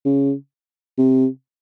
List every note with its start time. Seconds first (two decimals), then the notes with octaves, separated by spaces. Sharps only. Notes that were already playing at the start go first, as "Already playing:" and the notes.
0.05 C#3
0.98 C3